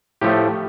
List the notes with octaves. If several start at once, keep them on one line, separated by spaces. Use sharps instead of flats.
A2 F3 A3 G4